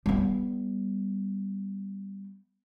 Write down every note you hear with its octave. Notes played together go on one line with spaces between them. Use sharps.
G3 B3